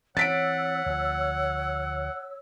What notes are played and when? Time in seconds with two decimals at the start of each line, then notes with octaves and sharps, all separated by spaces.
0.17 E3 C4 C#5 F#5 E6 A6 B6 D7
0.86 D2 F3